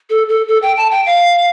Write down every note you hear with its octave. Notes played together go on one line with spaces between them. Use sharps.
A4
A4
A4
G5
A5
G5
F5